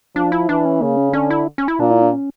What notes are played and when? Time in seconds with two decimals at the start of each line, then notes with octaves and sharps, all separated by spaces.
0.16 F3 D4
0.32 E4
0.49 E3 D4
0.65 C#4
0.81 C#3 A#3
0.97 C#4
1.13 D3 C#4
1.30 E4
1.58 C#4
1.68 E4
1.80 A#2 D4
1.91 E4
2.02 D4
2.13 C#4